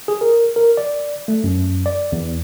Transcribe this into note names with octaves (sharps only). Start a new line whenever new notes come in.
G#4
A#4
A#4
D5
A3
F#2
D5
E2